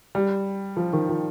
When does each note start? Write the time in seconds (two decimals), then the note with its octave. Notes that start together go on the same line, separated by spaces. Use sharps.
0.15 G3
0.77 F3
0.93 D#3
1.09 F3